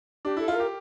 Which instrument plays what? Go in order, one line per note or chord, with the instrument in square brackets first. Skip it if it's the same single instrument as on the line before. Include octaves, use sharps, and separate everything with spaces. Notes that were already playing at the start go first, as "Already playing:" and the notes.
[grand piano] D4 [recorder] G4
[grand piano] E4 [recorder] A4
[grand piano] F4 [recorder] A4
[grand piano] G4 [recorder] A#4